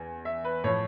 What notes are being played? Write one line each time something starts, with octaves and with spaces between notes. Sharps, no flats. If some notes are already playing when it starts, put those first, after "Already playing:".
Already playing: E2 G#5
E5
B4
A2 F3 C#5